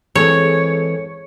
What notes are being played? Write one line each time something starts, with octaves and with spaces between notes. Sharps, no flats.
E3 G#3 C4 G#4 A4 C#5